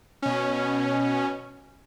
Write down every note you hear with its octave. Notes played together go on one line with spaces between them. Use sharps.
B2 C#4